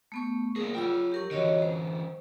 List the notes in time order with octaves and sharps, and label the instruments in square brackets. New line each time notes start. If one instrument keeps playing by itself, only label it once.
[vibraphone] A3 B3 C#6
[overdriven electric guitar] A#3 G#4 [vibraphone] A#4
[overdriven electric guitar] F#3 G5 [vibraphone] F4 B5 E6
[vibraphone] G4 A#4 C#6
[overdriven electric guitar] D3 E3 [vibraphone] F#4 C#5 D#5
[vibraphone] C5